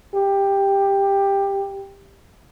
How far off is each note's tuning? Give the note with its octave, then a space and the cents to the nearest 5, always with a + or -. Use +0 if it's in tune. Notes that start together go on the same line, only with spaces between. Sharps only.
G4 +10